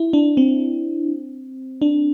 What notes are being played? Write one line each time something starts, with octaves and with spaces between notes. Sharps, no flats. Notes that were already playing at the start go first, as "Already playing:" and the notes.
Already playing: E4
D4
C4
D4